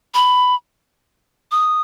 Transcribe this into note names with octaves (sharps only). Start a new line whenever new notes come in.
B5
D#6